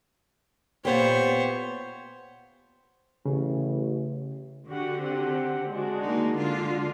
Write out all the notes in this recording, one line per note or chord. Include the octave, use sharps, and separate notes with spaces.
A#2 B3 G4 C5 C#5
A1 C#3
D3 F#4 G4 F#5
C4 G4 F#5
G#3 D4 F#4
D#3 A#3 D#4
D3 G#3 D4 F4